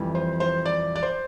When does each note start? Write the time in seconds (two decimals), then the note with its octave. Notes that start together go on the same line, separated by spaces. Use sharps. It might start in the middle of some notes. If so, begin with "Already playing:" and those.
Already playing: F2 E3 G3
0.15 C5
0.40 C5
0.65 D5
0.96 D5
1.03 C5